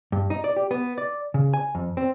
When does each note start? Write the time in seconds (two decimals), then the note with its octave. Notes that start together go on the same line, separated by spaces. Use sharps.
0.12 G2
0.30 D#4
0.44 D5
0.56 G4
0.71 B3
0.98 D5
1.34 C#3
1.54 G#5
1.75 F2
1.97 C4